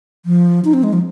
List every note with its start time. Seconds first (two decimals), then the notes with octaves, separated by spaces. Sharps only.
0.26 F3
0.65 D#4
0.74 C4
0.83 G#3
0.93 F3